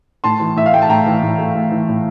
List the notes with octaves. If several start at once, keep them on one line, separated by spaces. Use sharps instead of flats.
A2 A5 C6
E3
A2 E5
F5
A3 G5
A5
A2 G5 A#5
E3
A2
A3
A2
E3
A2